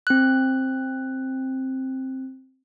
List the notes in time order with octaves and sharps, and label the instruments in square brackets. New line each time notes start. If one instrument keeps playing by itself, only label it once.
[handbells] C4 F#6